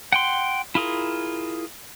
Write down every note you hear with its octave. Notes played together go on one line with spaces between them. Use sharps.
F#5 G5 C6
E4 F4 G#4 A#4